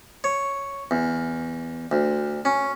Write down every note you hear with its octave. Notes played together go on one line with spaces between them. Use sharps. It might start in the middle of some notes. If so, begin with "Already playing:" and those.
C#5
E2
D2
C#4